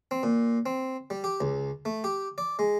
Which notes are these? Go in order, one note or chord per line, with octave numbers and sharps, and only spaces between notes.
C4
A#2
C4
G3
G4
C#2
A3
G4
D5
G#3